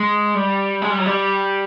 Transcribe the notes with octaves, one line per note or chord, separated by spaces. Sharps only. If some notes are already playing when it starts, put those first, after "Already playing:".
Already playing: G#3
G3
G#3
G3
F#3
G3